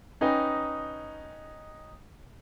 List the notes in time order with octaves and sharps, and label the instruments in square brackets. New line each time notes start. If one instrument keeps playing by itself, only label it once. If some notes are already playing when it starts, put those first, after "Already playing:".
[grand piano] C#4 D#4 B4 D#5 G5